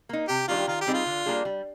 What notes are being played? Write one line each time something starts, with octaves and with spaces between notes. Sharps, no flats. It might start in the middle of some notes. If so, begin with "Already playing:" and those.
A#3 D#4
C3 G4
D#3 G3 D4 F4 G4
D#3 F4
G4
G3 C4 D#4 G#4
F4
D3
G3 A#3 D4 G#4
G3